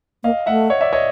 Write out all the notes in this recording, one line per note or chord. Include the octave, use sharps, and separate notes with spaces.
A#3 D#5 F5
A3 E5 F#5
C#5 D#5
D5 E5
C#5 D#5